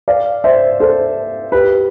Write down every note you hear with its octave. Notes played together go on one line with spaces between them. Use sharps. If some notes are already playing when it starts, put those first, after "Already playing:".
D5 F5
C5 E5
A4 C5
G4 B4